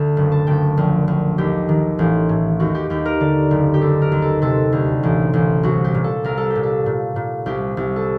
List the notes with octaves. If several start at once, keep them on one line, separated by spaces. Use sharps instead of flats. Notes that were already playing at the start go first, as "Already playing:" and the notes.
Already playing: D2 D3 A5
F#1
A5
F#1 G5
A#1
A#1
D#2 G4
D#3
A1
A2
D#2 F#4
G4
D#2 G4
A#4
D3 D5
F#1
G4
D#2 A4
A#4
D#2
A4
C3 A4
D2
A1
A1
C2 F#4
G4
A#2
A4
C2 A#4
A4
G4
A#2
A4
A#2
A#2
C2 G4
C2
A4